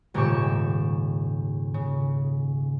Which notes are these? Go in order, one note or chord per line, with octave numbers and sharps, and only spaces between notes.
D#1 G#2 C#3 G4 C#6 E7
C#3